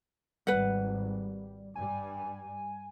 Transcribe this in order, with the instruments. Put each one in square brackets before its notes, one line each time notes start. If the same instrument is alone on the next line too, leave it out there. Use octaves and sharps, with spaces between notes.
[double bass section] G#1 [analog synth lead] G3 [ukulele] B4 F#5
[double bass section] G2 G3 [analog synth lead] G#5